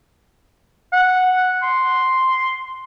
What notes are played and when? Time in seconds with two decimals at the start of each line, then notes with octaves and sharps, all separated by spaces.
0.93 F#5
1.63 C6